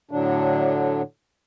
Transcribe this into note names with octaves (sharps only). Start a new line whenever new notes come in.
A2 D3 F#3 D4